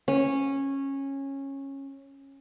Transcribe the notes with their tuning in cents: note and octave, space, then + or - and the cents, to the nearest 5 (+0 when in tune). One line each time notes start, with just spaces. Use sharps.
C#4 -15